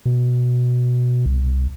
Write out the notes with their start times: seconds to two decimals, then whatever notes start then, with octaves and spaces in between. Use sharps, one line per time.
0.06 B2
1.26 C2